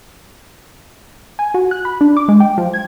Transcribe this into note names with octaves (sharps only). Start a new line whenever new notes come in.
G#5
F#4
F#6
B5
D4
D6
G#3
G5
F3
G#6